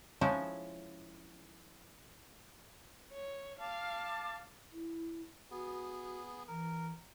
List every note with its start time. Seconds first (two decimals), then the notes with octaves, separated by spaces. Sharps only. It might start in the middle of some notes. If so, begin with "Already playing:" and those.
0.21 F3 G#3 C#4 D#4 E4
3.12 C#5
3.59 F5 A5 D6
4.72 E4
5.51 B3 F#4 G#4
6.48 E3 A#4